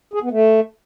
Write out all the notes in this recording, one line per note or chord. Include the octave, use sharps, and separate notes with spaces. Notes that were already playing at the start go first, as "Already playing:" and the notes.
G#4
B3
A3